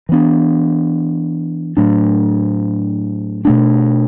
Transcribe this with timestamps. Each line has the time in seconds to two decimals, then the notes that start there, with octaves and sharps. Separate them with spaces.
0.09 E3 B3 D4
1.77 A2 F#3 A3 D4
3.45 B2 A3 D4